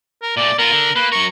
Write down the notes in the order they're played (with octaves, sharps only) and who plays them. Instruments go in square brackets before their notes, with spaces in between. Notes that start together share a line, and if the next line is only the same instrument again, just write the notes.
[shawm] A#4
[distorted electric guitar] A#2 A3 [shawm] D5
[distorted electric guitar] B3 F4 [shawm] A#4
[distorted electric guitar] D3
[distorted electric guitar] A#3 [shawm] B4
[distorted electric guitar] F#3 A#4 [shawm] C#6